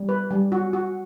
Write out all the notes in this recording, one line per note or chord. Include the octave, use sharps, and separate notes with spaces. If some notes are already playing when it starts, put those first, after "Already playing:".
Already playing: G3
B4
G3
F#4
F#4